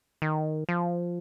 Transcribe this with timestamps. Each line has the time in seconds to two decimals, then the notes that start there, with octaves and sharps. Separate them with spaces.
0.22 D#3
0.69 F3